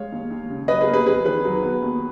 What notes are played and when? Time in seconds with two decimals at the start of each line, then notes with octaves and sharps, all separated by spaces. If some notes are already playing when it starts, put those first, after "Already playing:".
Already playing: G#3 C#5 F5
0.12 D#2
0.30 D#2
0.50 C#3
0.68 F#3 B4 D#5
0.81 G#4 B4
0.87 A#3
0.94 G#4 B4
1.06 F2 G#4 B4
1.25 D#3 G#4 B4
1.45 F#3
1.63 B3
1.82 D#2